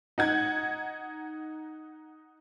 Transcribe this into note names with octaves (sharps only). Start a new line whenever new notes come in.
D#4 F#5 G#6